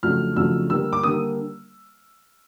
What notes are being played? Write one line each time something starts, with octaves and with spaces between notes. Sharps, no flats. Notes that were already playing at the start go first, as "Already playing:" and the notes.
F2 C#3 F#3 A3 D4 F6
F2 C#3 F#3 A3 D4 E6
D3 G3 A#3 E6
D6
D3 G3 A#3 D#6